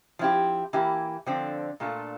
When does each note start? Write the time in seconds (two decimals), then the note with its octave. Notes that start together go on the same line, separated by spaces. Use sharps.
0.19 F3 C4 E4 G4
0.73 E3 A#3 E4 G4
1.26 D3 F3 C4 F4 A4
1.80 A#2 A3 D4 F4 A4